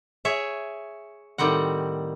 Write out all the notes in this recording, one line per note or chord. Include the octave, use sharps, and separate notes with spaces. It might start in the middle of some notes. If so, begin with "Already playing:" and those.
G#4 C#5 E5
A2 D#3 G3 C4 F#5